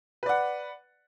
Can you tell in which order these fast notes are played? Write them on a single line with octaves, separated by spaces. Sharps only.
B4 D5 F#5